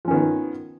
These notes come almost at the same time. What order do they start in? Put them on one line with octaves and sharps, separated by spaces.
F3 C#4 D#3 B3